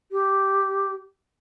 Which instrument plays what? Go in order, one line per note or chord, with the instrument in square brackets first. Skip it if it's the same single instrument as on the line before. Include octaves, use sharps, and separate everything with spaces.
[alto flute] G4